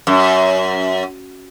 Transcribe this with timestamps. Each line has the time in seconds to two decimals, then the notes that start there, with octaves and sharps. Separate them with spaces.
0.07 F#2